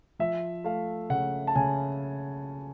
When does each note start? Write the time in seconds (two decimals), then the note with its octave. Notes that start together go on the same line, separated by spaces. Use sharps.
0.19 F3 E5
0.64 A3 F5
1.10 C#3 F#5
1.47 A5
1.55 C#3 G#5